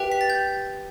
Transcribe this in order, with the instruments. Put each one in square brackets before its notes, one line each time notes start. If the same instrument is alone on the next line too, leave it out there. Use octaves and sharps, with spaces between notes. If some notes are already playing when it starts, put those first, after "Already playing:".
Already playing: [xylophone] G4 B4 E5 G5
B6
A6
G6